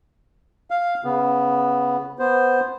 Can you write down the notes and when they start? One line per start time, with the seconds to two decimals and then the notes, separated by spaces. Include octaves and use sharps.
0.71 F5
1.04 C#3 B3
2.19 B3 C5